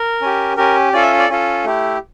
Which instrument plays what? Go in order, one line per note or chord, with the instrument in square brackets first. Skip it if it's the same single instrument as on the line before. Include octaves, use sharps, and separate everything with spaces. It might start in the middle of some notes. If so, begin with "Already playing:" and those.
Already playing: [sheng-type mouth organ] A#4
C#4 G4
C#4 G4 A#4
C#4 F4 A4 D5
E5
D5
C#4 F4 A4
A3 E4 G4